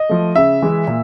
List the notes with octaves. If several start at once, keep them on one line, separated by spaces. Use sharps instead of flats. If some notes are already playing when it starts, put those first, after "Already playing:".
Already playing: D#5
F3 A3
C#3 E5
E3 G#3
A#2